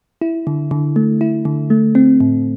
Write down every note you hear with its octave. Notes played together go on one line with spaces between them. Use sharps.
E4
D3
D3
A3
E4
D3
A3
C4
A2